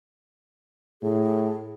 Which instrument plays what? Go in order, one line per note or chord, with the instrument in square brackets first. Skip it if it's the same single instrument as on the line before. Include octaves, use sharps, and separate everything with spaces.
[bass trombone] A2 [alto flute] G#4